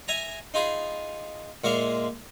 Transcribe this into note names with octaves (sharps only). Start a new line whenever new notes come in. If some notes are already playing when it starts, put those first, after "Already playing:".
E5 G#5 A#5
D#4 F4 G#4 B5
A#2 G#3 E5 F5